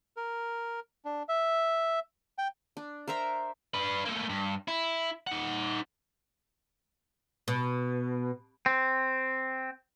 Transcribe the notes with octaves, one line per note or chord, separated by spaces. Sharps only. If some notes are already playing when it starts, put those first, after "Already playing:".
A#4
D4
E5
G5
D4
A#4 C5 E5 A#5
D4 B4
A3 A#3
G2
E4
D#4 F#5
B2
C4